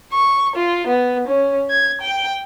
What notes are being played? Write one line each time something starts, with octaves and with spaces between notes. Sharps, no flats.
C#6
F4
B3
C#4
G#6
G5